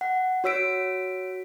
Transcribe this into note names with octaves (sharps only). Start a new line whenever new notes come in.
F#5
F#4 C#5 E6 B6 D7